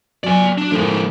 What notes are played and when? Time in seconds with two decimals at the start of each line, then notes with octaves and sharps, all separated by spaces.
0.24 F#3 D5 G#5
0.58 D4
0.72 A2 D#3 F3 G#3 A3